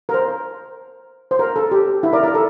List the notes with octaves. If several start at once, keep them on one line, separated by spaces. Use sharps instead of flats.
A#4
C5
C5
A#4
A4
G4
E4
A#4 D5
A#4
A4